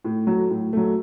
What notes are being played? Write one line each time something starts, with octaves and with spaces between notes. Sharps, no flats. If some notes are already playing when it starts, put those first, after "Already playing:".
A2
F#3 A3
A2
F#3 A3